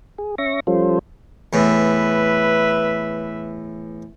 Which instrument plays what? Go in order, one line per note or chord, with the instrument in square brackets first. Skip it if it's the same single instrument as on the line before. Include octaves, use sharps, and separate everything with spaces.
[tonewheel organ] G#4
C#4 E5 C#6 A#6
F3 G3 C#4 F4 A4 C5
[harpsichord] E2 A2 [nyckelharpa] B4 E5